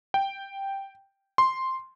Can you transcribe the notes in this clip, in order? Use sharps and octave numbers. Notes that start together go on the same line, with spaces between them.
G5
C6